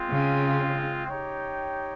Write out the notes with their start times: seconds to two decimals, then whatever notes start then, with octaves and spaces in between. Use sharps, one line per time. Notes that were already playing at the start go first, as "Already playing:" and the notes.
Already playing: G#3 C4 F4
0.09 C#3
1.07 D#4 G4 C#5 G5